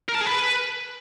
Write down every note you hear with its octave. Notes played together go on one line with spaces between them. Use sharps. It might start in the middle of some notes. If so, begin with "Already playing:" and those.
A#4
A5
G#4
B4